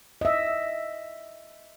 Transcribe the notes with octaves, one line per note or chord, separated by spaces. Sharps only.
D#5 E5